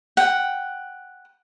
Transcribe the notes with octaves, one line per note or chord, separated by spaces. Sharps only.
F#5 G5